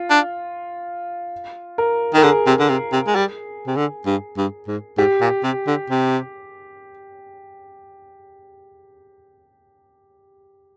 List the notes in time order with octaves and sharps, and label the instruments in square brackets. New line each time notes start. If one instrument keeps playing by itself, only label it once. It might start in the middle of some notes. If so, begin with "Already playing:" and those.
Already playing: [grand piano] F4
[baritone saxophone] D4
[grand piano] A#4
[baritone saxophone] D#3 [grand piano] A#4
[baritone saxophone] D3 [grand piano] G#4
[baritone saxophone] C3
D3
C3
C3
G#3
G3
C3
D3
G2
G2
G#2
[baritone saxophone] G#2 [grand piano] G4
[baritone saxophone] A#2
C3
D3
C3